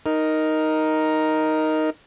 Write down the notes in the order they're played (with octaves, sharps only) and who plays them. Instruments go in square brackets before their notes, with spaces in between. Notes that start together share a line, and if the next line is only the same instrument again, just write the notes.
[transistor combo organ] D#4 A#4